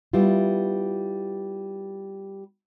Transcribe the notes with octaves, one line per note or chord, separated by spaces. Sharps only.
G3 B3 E4 F4